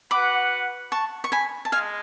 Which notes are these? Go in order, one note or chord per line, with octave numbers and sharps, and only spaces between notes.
F#4 B4 F#5 B5 D6
A5 C#6
C#6
G#5 B5
A5
G#3 F5 G#5